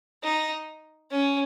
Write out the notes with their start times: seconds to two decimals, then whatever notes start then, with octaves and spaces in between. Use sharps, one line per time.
0.23 D#4
1.11 C#4